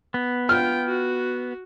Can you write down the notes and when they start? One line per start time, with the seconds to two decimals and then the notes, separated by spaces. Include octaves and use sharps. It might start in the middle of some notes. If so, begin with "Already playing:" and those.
0.14 B3
0.49 F4 G5 F6
0.87 F#4